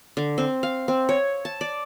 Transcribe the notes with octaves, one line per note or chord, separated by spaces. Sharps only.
D3
C4
F5
C4
C#5
A5
D5